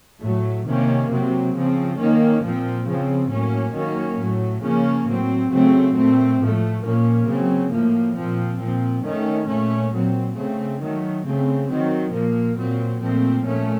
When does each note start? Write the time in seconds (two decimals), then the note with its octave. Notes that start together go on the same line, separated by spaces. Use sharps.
0.21 A2 F#3 A3
0.65 C3 D#3 A#3 C#4
1.10 C3 F#3 C4
1.53 C#3 F3 C4
1.98 D#3 A#3 C#4
2.42 A#2 F3 C4
2.86 C#3 F3 C4
3.30 A2 F#3 A#3 C#4
3.74 D#3 F#3 A#3 C#4
4.19 A2 F#3 A3
4.62 C#3 F3 A#3 C#4
5.07 A2 F#3 C4
5.51 C#3 F#3 A3 C4
5.95 A#2 A3 C4
6.39 A2 F3 A3
6.83 A#2 F3 A#3 C#4
7.27 C#3 F#3 C4
7.71 A2 F3 A#3
8.16 A#2 F3 C4
8.60 A#2 F3 C4
9.04 D#3 A3 C#4
9.47 A#2 A3 C#4
9.92 A#2 F#3 C4
10.36 C#3 A3 C4
10.80 D#3 F#3 A3
11.24 C#3 A3 C4
11.68 D#3 F#3 C4
12.13 A#2 F3 A#3
12.57 A#2 F#3 C4
13.01 A#2 F3 A3 C4
13.45 A#2 A3 C#4